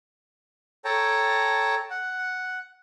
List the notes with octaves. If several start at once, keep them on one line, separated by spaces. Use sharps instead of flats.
A4 C#5 G5 A5 A#5
F#5